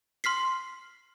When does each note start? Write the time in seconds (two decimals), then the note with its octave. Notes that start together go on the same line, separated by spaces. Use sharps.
0.24 C6 F6 B6 C7